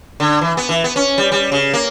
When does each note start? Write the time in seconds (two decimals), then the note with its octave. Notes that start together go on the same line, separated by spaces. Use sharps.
0.20 D3
0.41 E3
0.57 B3
0.69 E3
0.84 B3
0.96 C#4
1.18 G3
1.32 G3
1.52 C#3
1.74 A#3